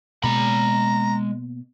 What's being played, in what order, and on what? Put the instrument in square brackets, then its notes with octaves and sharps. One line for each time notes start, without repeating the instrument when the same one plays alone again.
[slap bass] B2 A#3 [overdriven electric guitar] G#3 B5 [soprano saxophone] A#5